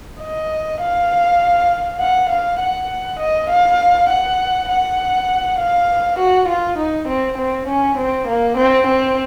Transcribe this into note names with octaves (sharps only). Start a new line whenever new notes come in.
D#5
F5
F#5
F5
F#5
D#5
F5
F#5
F#5
F5
F#4
F4
D#4
C4
C4
C#4
C4
A#3
C4
C4